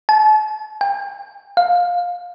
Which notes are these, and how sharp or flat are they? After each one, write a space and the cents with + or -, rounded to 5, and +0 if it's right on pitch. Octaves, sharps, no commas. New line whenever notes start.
A5 -45
G5 +40
F5 +15